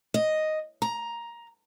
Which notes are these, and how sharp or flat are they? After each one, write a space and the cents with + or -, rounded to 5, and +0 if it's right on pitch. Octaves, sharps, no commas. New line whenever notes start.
D#5 +0
A#5 +10